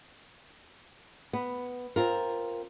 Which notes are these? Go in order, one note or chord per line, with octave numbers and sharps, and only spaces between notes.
B3
C4 F4 A#4